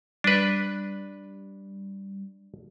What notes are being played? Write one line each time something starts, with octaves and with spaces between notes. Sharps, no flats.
G3 D4 B4